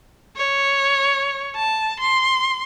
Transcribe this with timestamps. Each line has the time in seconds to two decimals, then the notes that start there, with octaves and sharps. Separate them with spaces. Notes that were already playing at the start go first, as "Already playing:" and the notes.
0.36 C#5
1.56 A5
2.00 C6